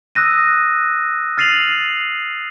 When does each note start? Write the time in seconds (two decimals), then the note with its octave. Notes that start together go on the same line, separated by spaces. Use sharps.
0.15 D#6 E6 F#6 A#6 D#7
1.38 F6 A6 C7 D#7 F7 F#7